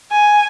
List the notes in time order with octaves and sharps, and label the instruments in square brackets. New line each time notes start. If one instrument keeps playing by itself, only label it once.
[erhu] G#5